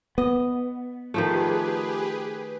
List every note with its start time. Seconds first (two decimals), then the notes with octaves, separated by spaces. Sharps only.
0.18 B3 D#5
1.14 D#3 F3 A3 G4 G#4 B4